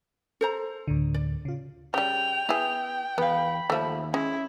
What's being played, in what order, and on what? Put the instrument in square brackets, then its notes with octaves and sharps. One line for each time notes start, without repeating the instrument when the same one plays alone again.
[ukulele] A4 C5 A#5
[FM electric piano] D2 A2 D3
[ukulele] D5
[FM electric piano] C#3 F4
[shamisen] C#3 G3 [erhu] G5 [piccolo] F7
[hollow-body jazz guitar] B3 [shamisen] E4 G#4 [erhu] G5
[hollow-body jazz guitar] E2 F5 [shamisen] B3 [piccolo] B5
[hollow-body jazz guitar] D#2 E5 [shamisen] F3 A3
[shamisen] G#3 [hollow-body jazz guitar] C#4 [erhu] E4